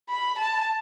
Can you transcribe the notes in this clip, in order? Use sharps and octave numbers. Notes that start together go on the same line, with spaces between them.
B5
A5